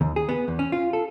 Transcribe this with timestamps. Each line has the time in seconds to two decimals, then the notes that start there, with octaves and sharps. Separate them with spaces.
0.01 D#2
0.16 G#4
0.29 B3
0.48 E2
0.59 C#4
0.72 F4
0.93 A4